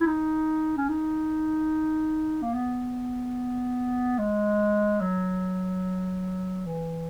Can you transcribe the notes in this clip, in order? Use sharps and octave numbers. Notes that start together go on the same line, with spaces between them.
E4
D#4
C#4
D#4
A#3
B3
G#3
F#3
E3